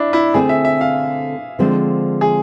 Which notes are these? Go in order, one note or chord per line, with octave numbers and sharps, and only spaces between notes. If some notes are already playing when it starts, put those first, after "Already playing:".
Already playing: D4 E4
E4
D3 A3 C4 G#4
E5
E5
F5
D3 F3 G#3 C4
G#4